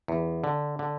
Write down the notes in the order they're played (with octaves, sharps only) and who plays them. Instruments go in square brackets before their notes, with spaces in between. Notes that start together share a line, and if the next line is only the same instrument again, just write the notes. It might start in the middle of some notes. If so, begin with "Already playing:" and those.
[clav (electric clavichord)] E2
D3
D3